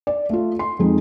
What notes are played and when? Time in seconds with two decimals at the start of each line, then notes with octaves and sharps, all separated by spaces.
0.07 D5
0.30 A3 F4
0.59 C6
0.79 F2 G#3 D#4